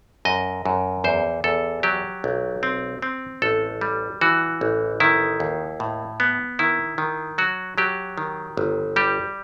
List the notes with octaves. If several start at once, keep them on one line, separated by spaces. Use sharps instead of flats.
F#2 D#5
F#2
E2 C5
E2 A4
F#3 G4
B1
C4
C4
A1 A4
G3
E3 F#4
A1
D#3 E4
D#2
A2
B3
D#3 E4
D#3
F#3 F#4
F#3 G4
D#3
G1
G3 G4